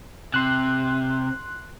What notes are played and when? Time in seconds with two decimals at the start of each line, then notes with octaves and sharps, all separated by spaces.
0.34 C3 C6 F#6